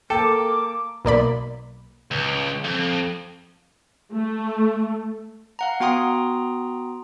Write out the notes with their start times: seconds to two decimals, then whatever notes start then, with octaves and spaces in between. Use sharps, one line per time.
0.10 A#3 A4 G5 D6
1.05 B1 A#3 D5 B5
2.11 C#2
2.64 F2
4.13 A3
5.59 F5 F#5 A#5
5.80 B3 F#4 G5 A#5 C6 D#6